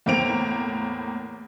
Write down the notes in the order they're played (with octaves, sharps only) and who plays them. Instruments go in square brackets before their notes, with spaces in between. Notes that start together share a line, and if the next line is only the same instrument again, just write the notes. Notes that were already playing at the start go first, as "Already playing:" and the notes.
[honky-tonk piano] E2 A2 A#3 C4 D7 F7